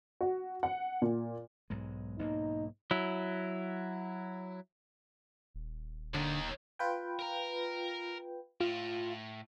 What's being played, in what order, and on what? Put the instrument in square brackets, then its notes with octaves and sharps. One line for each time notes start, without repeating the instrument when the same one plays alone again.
[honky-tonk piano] F#4
F#5
A#2
[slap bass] B1 G#2 G#3
[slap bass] B1 G#2 A#3 [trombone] D#4
[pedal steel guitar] F#3 E4
[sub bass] D#1
[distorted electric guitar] D#2 D#3 [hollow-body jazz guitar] D3
[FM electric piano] F4 B4 G5
[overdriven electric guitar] A#4 A#5
[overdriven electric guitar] A2 [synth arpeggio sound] F4